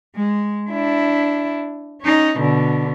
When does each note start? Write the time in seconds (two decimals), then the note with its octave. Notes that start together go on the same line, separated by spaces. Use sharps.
0.16 G#3
0.70 D4 E4
2.01 C#4 D#4
2.38 B2 D3